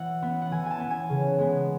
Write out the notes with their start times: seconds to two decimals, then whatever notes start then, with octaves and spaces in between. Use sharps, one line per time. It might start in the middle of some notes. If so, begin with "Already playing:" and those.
Already playing: E3 F#5
0.22 B3
0.41 F#5
0.51 E3 G#5
0.66 G#5 A5
0.80 B3
0.90 G#5
1.09 C#3
1.39 G#3 B3